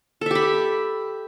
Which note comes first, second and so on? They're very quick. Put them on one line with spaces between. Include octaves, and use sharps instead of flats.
A4 E5 G4 B5